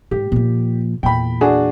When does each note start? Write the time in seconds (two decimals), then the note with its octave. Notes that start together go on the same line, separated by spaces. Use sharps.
0.11 G#2 G4
0.32 A#2 F3
1.03 E2 A#2 G5 B5
1.41 D4 F#4 G#4